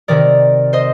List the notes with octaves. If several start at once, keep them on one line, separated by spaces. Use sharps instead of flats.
C3 D#3 A#4 D5
C5 D#5